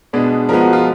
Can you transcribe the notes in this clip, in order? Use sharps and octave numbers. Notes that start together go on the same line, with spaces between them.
B2 G#3 B3 D4 G#4
F3 G#3 B3 A#4
F#4
F4